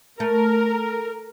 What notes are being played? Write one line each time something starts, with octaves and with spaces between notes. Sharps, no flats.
A3 A#4